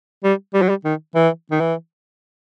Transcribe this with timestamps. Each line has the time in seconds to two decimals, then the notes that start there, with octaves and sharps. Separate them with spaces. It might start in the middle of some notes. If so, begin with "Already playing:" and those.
0.24 G3
0.54 G3
0.62 F#3
0.69 G3
0.85 D#3
1.15 E3
1.51 D#3
1.60 E3